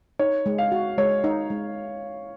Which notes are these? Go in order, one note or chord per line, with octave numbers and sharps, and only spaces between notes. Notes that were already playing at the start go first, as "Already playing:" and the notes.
D#4 C#5
G#3
F5
F#4
G#3 C#5
D#4
G#3